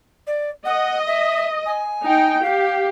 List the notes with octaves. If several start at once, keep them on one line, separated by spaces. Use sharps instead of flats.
D5
D#5 F#5
E5
G#5
D#4 G5
G4 F5